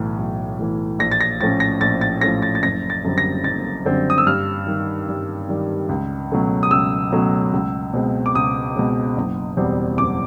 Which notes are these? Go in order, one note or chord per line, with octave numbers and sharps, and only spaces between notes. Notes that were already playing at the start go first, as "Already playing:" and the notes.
Already playing: B1 A2 E3
B1
A2 E3
A#1 A#6
A6
A#6
A2 F3 A3 C#4 A6
A#6
A#1 A6
A6
A2 F3 A3 C#4 A#6
A6
A6
F#1 A#6
A6
F#2 D3 G3 C4
A#6
F#1 A6
F#2 D3 G3 C4
D#6
E6
G2 F6
D#3 G3
G2
D#3 G3
C#2
B2 F#3 A3 C#4
D#6
C#2 E6
B2 F#3 A3 C#4
C#2
B2 G#3 C4
D6
C#2 D#6
B2 G#3 C4
F#1
E2 B2 G3 C4
F#1 D6